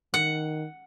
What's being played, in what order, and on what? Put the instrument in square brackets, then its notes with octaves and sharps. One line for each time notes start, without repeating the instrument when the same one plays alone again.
[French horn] D#3 [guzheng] F#5